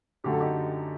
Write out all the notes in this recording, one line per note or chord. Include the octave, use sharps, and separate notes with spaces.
F#2 D3 A3 G4
A4
D#4 G4